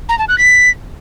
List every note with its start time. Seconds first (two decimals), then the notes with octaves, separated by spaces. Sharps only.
0.09 A#5
0.19 A5
0.29 F#6
0.38 B6